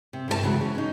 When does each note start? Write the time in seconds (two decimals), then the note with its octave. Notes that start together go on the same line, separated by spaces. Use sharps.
0.13 C3
0.28 G2 E4 G4 A5
0.43 C#3 E3 G#3 F#4
0.61 C#4
0.75 C#4 D#4